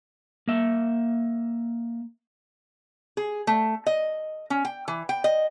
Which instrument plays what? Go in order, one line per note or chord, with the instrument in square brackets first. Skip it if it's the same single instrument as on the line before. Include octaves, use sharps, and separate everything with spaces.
[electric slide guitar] A#3 E5
[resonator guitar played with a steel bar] G#4
A3
D#5
C#4
G5
E3
G5
D#5